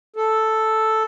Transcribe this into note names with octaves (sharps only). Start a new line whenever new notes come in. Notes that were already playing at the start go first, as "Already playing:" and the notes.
A4